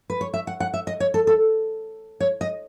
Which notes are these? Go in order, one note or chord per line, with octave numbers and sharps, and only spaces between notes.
B4
C#5
E5
F#5
F#5
E5
D#5
C#5
A4
A4
C#5
D#5